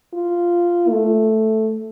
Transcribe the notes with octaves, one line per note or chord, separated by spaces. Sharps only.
F4
A3